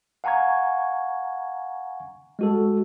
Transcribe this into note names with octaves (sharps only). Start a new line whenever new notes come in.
F5 F#5 G#5 A#5 C#6 G#6
G#3 F#4 A4